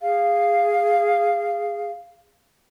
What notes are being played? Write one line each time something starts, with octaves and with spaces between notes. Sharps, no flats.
G#4 F5